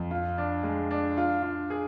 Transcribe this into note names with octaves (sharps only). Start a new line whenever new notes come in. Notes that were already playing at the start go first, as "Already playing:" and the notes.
Already playing: F2
F4
D4
G#3
D4
F4
F4
G#4